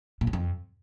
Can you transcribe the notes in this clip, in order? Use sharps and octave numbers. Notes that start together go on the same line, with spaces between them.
A#2
F#2
F2